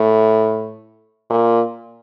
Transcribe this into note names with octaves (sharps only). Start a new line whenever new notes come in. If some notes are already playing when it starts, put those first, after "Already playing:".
Already playing: A2
A#2